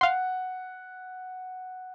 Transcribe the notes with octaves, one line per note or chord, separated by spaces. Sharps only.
F5 F#5 C6